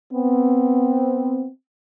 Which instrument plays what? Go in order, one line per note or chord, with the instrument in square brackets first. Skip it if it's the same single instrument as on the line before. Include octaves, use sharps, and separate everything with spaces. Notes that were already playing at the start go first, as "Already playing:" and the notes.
[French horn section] B3 C4